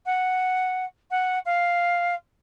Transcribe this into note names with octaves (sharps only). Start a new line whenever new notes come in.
F#5
F#5
F5